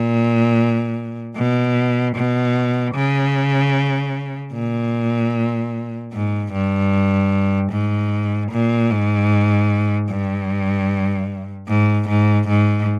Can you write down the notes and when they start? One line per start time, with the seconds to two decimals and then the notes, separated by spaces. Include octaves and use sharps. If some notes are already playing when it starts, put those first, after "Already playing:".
Already playing: A#2
1.36 B2
2.16 B2
2.95 C#3
4.54 A#2
6.13 G#2
6.53 G2
7.72 G#2
8.51 A#2
8.91 G#2
10.10 G2
11.68 G#2
12.08 G#2
12.48 G#2